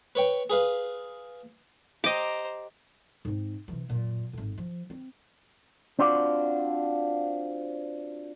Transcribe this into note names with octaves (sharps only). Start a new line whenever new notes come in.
B4 C#5 G5
G#4 B4 F5
G4 C5 D#5 A#5 D6
G#2 C4
C3 E3
F#2 A#2
G#1 A2
F3
C4
C4 D4 F4 F#4 D5